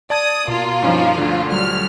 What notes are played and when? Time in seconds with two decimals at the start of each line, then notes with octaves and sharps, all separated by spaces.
0.10 D5 A5 D#6 G#6
0.48 B2 A#3 F4
0.82 G2 F3 C#4 D#4
1.18 D2 D3
1.52 F#3 G3 F6